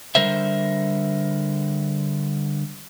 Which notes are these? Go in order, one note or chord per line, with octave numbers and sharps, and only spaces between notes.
D3 G3 A#4 C5 E5